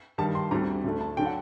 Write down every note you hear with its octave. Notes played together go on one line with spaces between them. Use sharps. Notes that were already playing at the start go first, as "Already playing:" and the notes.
G2 D#3 G3 A5
C6
D2 D3 G3 C4 A#5
D2 D3 A3
A5
D3 F#3 G5
F#5